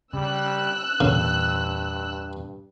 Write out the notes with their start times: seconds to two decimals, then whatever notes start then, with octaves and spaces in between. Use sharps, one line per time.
0.13 C#3 G3 E6 F#6
1.01 E2 G2 A#2 C#3 E3